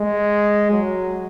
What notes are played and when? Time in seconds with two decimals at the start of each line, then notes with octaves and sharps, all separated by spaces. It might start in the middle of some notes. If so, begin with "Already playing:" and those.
Already playing: G#3
0.71 F#3